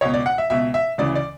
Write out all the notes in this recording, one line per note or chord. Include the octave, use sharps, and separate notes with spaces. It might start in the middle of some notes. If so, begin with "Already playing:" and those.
C#2 B2 C#5
D5
F#5
E5
C#2 B2 E5
E5
D2 C#3 E3 D5
D5